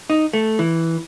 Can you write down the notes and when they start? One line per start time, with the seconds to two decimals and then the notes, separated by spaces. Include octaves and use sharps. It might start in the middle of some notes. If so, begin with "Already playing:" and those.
0.10 D#4
0.33 A3
0.59 E3